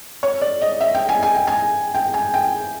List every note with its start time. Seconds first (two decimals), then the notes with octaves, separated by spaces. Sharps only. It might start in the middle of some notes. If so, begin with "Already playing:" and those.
0.23 C#5
0.42 D5
0.61 D#5
0.80 E5
0.95 G5
1.09 G#5
1.23 G#5
1.35 G5
1.47 G#5
1.95 G5
2.14 G#5
2.34 G5